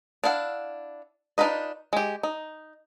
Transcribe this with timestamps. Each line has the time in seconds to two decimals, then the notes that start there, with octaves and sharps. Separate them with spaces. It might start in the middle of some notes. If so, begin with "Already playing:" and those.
0.24 D4 E4 F5 F#5
1.38 D4 D#4 F4 B4 D#5
1.93 G#3 G4
2.23 D#4